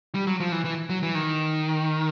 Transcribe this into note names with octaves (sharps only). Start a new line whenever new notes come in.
G3
F#3
F3
E3
E3
F#3
E3
D#3